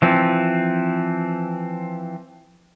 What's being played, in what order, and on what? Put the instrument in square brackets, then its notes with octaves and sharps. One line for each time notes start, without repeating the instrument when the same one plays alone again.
[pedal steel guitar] E3 F3 C4